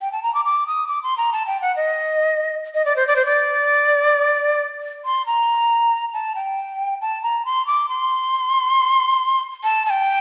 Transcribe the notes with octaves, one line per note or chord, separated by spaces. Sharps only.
G5
A5
A#5
D6
D6
D#6
D6
C6
A#5
A5
G5
F#5
D#5
D#5
D5
C5
D5
C5
D5
C6
A#5
A5
G5
A5
A#5
C6
D6
C6
A5
A5
G5